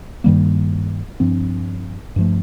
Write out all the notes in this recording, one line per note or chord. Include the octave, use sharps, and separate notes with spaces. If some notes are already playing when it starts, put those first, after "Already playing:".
G2 D#3 G3 A#3
G2 F3 C4
G2 F3 A3